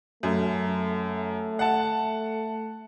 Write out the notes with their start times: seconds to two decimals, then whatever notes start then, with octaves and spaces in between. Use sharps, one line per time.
0.23 F#2 A3
1.59 F#5 A5